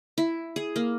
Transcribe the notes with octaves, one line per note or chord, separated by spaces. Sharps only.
E4
G#4
A#3